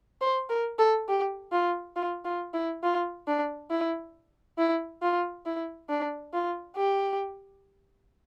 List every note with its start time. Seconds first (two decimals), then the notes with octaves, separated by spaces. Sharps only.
0.21 C5
0.49 A#4
0.79 A4
1.08 G4
1.52 F4
1.96 F4
2.25 F4
2.54 E4
2.83 F4
3.27 D4
3.71 E4
4.58 E4
5.02 F4
5.46 E4
5.90 D4
6.33 F4
6.77 G4